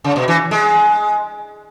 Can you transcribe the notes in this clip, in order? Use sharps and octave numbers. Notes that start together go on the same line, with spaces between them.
C#3
B2
E3
G#3